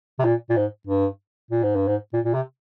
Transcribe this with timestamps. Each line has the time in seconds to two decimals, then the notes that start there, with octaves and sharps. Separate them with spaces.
0.19 C3
0.24 A#2
0.50 A#2
0.56 G#2
0.87 G2
1.51 A#2
1.63 G#2
1.75 G2
1.87 G#2
2.13 A#2
2.25 A#2
2.34 C3